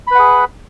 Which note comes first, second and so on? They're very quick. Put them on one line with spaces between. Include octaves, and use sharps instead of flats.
B5 B4 F#5 G#4